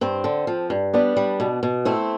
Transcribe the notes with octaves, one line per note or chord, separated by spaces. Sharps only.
G2 C4
D3
F3
G2
G3 B3 D4
G3
B2
B2
A3 C4 E4